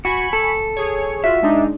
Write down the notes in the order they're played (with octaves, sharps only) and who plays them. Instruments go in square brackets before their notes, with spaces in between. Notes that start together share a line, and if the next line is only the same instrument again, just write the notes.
[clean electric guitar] F#4 [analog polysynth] G#5 B5 C#6
[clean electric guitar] A4
[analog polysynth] G#4 C#5
[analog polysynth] F4 F#4 [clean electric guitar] E5
[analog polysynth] G#3 D4 D#4